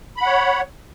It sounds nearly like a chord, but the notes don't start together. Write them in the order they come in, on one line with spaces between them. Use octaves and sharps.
B5 F#5 C#5